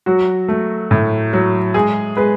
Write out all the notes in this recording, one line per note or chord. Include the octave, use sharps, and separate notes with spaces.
F#3 F#4
A3
A2
F#3
G#3 G#4
G#3 B4